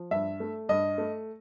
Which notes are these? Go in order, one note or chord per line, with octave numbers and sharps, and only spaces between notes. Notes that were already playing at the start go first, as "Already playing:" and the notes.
Already playing: F3
G2 E5
A3
G2 D#5
A3